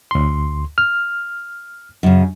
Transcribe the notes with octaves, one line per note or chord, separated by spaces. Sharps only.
D2 C6
F6
F#2 C#3